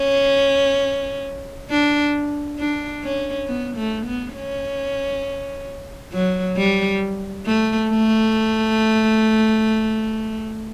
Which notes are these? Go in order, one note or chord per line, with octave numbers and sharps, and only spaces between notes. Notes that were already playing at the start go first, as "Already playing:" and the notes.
Already playing: C#4
D4
D4
C#4
B3
A3
B3
C#4
F#3
G3
A3
A3